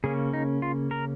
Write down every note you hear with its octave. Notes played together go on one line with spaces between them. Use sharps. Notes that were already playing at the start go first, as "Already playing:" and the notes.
C#3 A#3 C#4 G#4
D#4
F4
A#4